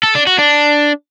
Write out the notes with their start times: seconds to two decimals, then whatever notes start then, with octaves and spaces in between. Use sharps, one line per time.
0.03 A4
0.15 D4
0.27 F#4
0.39 D4